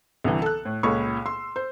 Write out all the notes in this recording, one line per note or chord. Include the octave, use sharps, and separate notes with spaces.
C2 D3 E3
A4 F#6
A2
C#2 A#2 A4 C#5 B5 C#6
C6 E6
C5